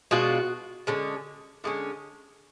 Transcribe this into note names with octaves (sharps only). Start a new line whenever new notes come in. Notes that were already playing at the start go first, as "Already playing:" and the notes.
B2 G#3 D4 F4 F#4
D3 G#3 C#4
D3 G#3 C#4